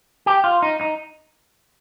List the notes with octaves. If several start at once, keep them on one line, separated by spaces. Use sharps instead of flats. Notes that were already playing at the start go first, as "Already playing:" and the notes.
G4
F4
D#4
D#4